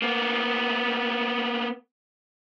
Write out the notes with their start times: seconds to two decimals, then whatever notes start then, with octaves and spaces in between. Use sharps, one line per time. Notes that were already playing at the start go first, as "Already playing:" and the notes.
0.02 A#3 B3